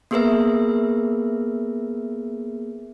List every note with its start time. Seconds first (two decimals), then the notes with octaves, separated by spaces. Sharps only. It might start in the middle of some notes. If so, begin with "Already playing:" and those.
0.11 A#3 B3 G#4 A#4 B4 E5